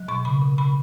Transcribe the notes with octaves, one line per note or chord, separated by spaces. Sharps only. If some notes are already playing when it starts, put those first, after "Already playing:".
Already playing: F#3
B2 C#6
C#3 B5
C#3
C#3 B5